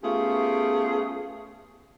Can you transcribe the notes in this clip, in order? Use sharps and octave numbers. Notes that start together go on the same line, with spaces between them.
A3 B3 C#4 F4 G4 G#4